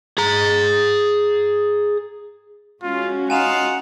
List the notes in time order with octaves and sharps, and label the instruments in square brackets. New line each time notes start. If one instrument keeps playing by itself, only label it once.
[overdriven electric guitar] G#4 A#5
[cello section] G#3 C#4 F#4 [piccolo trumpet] F4
[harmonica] D#4 F4 F5 [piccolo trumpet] F#5 [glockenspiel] G#5 E7 F7